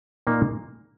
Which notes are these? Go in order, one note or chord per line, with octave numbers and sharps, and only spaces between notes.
A#2 A#3 D#4